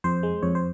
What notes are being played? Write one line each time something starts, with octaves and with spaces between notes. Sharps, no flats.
F2 C5
G#3
F2 C#5
C5